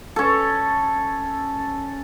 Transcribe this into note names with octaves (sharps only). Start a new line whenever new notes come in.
C#4 A4